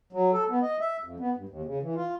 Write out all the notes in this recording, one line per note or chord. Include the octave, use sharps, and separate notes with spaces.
F#3
A4
B3
D#5
E5
F2
B3
G2
D#2
C#3
E3
F4